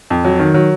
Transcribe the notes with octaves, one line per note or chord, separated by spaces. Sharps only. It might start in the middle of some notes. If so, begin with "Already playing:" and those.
F2
F#3
D#3
F#3